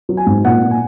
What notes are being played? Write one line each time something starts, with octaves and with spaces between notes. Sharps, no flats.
F#3
G#5
G#2
A#2 F#5
A#2
G#5